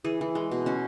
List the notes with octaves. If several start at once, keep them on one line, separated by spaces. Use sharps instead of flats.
E3 G#4
E3
G#3
B2
C#4 F#4